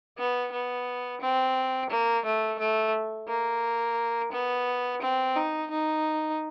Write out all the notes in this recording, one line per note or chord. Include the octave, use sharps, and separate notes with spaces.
B3
B3
C4
A#3
A3
A3
A#3
B3
C4
D#4
D#4